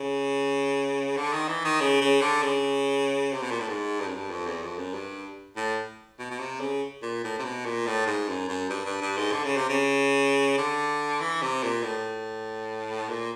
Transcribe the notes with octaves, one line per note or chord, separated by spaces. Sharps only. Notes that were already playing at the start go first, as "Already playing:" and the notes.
Already playing: C#3
D3
D#3
E3
D#3
C#3
C#3
D3
C#3
C3
B2
A#2
A2
G#2
G2
F#2
G2
F2
E2
F2
F#2
G2
A2
B2
B2
C3
C#3
A#2
A2
C3
B2
A#2
A2
G#2
F#2
F#2
G2
G2
G2
G#2
D3
C#3
C3
C#3
D3
E3
C3
A#2
A2
A#2